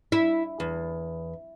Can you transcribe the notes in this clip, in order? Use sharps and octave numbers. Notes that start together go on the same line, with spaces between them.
E4
E2